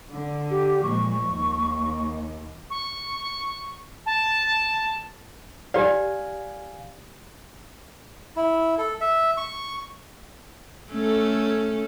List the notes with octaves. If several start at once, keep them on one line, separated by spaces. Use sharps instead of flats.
D3
G4
A#2 F3 G#3 C#6
D#2
C#6
A5
G4 D5 F5 G#5
E4
A4
E5
C#6
A3 C#4 A4